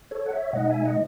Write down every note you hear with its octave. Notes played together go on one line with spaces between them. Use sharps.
A4 C#5
F#5
C#5 E5
B2 G#3 D#4 D#5 F#5
E5 G#5
D#5 F#5